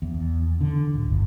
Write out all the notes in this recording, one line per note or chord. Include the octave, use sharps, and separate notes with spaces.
E2
D3
D1
G1